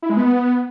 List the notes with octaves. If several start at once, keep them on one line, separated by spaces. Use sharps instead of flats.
E4
G#3
B3